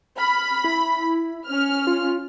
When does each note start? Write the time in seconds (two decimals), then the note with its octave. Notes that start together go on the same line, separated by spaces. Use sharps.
0.18 B5 F6
0.64 E4
1.46 C#4 F6
1.87 F4